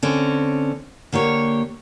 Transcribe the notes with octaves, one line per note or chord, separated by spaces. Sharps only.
D3 C4 C#4
D3 A#3 G4 C#5